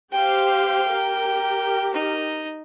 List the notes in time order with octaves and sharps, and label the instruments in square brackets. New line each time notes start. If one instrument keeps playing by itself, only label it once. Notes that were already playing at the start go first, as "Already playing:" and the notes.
[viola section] G4 C5 F5 [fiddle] G5
[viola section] G4 A#4
[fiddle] D#4